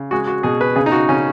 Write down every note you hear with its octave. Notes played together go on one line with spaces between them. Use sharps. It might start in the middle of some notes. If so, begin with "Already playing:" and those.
Already playing: C#3
G#3 F#4
F#4
B2 G#4
B4
C#3 G#4
D#4
F#4
C#3 C#4